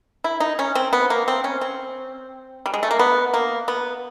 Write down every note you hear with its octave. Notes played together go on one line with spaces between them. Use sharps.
E4
D#4
C#4
C4
B3
A#3
C4
C#4
C4
G3
G#3
A3
A#3
B3
A#3
B3